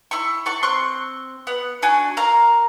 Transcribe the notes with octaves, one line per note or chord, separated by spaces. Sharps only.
E4 C#6
A4 F#5 C#6
C4 C6 C#6 F#6
B3 F#5
D4 F#4 G#5
A#4 F5 A#5